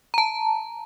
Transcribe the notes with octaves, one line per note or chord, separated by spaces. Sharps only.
A5 A#5